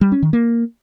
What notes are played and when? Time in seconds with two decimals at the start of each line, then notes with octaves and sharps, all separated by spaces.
0.01 G3
0.12 C#4
0.22 D#3
0.33 A#3